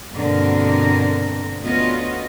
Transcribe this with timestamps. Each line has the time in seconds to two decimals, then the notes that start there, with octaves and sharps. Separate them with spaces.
0.13 G2 B2 D3 A#3 C4 A#4
1.63 D2 B3 C#4 F4 F#4 D#5